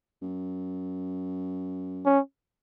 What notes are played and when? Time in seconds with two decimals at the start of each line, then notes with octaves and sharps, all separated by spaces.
0.22 F#2
2.06 C#4